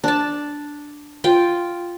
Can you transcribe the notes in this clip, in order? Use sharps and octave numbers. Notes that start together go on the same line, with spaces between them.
D4 A5
F4 G5